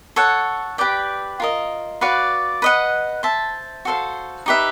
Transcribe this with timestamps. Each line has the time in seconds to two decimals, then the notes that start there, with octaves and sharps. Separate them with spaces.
0.16 A4 C#5 F#5
0.78 G4 B4 D5 G5
1.40 F4 A#4 D#5
2.01 F#4 B4 D5 F5
2.62 B4 D#5 F#5
3.23 C5 E5 A5
3.85 F#4 A4 C5 F5
4.46 D#4 G4 B4 E5